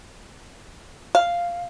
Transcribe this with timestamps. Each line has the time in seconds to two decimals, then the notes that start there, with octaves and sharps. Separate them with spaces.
1.15 F5